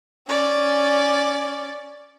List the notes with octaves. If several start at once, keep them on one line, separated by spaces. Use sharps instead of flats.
C#4 D5